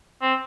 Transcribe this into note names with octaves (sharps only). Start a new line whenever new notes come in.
C4